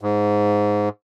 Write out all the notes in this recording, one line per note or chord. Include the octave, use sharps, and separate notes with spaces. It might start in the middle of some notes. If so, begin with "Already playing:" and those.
G#2